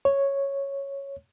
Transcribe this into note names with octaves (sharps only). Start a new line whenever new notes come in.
C#5